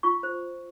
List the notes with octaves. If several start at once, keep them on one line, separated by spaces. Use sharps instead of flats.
F4 C#6
C5